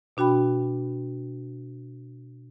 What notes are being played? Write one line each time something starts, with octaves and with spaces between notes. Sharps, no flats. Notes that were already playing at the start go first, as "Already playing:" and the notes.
B2 D4 F#4 G5 B5